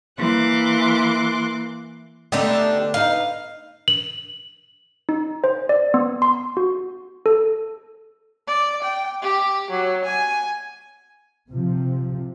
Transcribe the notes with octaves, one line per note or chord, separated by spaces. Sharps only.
E3 A#3 C6 D6 F#6
D3 A3 B3 D4 D#4 G4
D#4 B4 F5
F#7
D#4
C5
D5
B3
C6
F#4
A4
D5
G5
G4
F#3
G#5
C3 F3